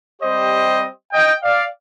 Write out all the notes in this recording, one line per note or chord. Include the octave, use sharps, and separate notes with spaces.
G3 C4 G4 C5 D#5
D#5 G5
D5 F5